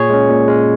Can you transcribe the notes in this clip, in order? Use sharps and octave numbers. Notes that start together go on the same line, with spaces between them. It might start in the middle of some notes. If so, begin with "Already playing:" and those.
Already playing: A#2 G#4 C#5
G#3 C#4
A#2
G#3 C#4